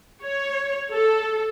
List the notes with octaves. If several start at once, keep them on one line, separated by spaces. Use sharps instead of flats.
C#5
A4